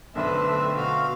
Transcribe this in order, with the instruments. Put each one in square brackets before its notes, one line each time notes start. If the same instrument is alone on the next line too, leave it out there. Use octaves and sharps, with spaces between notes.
[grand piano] B1 D3 B4 [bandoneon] A3 D4 [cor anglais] C4 [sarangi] E5
[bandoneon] B2 F#4 [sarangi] F5